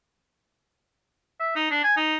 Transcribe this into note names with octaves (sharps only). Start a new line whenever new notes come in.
E5
D#4
D4
G#5
D#4